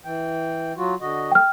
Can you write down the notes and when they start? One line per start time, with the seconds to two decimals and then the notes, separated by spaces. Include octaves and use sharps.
0.05 E3 G5
0.77 F#3 F4 F#4
1.01 D3 F#4 D#5
1.31 G5 F6